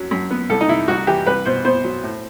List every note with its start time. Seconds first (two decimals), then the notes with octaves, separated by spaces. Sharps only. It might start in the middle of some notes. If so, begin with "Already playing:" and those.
Already playing: F#2 F#3
0.11 F#2
0.30 B3
0.50 C2 A4
0.61 D#4
0.69 C3 E4
0.88 C2 F#4
1.07 E3 G4
1.27 C2 B4
1.45 B2 C5
1.65 B3 C5
1.84 F#3
2.03 A2